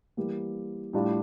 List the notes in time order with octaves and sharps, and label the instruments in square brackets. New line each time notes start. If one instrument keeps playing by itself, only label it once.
[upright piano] E3 G3 A#3
A2 G3 D4 F4